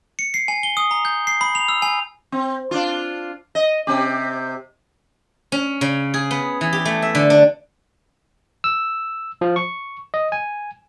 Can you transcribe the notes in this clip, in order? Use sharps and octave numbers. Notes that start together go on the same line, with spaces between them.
C#7
C7
G#5
G7
D#6
A#5
G6
C7
B5
F7
E6
G#5
C4
D4 F4
D#5
C3 C4 G4
C#4
C#3
G#4
B3
E3
G4
A3
E5
D3
D4
E6
F3
C#6
D#5
G#5